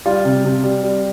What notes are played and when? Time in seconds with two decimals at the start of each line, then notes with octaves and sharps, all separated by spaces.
0.06 G3 F4
0.25 C3
0.45 C3
0.64 G3
0.83 G3